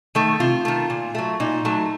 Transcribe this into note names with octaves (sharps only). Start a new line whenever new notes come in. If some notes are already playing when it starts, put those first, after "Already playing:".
D#3 A3
C3 F4
D#3 A3
A#2
F#3 A3
A#2 D#4
F#3 A3